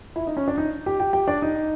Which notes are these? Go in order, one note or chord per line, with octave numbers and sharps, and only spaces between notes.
E4 E5
D#4 D#5
C#4 C#5
D4 D5
D#4 D#5
G4 G5
G4 G5
G4 G5
D4 D5
D#4 D#5